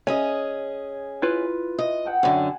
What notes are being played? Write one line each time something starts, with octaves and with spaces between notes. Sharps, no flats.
C#4 G#4 D#5 G#5
E4 F4 B4
D#5
F#5 G5 A5
F#2 D3 G#5 A5